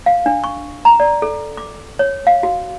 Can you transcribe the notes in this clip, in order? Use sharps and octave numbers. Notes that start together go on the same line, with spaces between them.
F5
D4
C#6
A#5
D5
A4
D6
C#5
F5
F#4